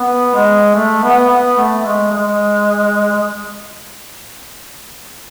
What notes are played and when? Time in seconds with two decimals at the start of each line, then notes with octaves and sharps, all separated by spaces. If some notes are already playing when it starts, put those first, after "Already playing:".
Already playing: B3
0.35 G#3
0.75 A3
1.03 B3
1.29 B3
1.57 A3
1.85 G#3
2.12 G#3
3.10 G#3